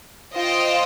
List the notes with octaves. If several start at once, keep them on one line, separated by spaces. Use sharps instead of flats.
F4 C5 D#5 G5